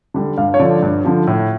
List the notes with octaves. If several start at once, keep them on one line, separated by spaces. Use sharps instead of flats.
D3 G3
G2 F5
C#5
D3 F3 D5
G2
D3 F3
A2